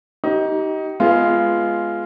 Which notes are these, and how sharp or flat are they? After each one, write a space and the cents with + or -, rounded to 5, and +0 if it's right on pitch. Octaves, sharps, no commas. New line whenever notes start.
D#4 +20 G4 -25
G#3 +10 B3 +0 F4 -10